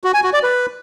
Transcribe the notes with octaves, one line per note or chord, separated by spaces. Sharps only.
F#4
G#5
F#4
D5
B4